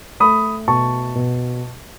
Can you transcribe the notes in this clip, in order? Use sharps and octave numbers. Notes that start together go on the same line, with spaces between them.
A3 B5 D#6
B2 A5 C#6
B2